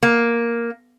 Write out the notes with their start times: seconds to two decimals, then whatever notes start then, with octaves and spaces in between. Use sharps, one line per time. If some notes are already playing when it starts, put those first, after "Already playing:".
0.03 A#3